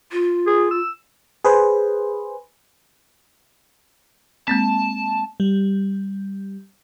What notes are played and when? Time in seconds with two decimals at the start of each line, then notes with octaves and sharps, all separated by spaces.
0.12 F4
0.47 G#4
0.71 E6
1.45 G#4 B4 C5
4.48 G#3 A#3 C4 A5
5.40 G3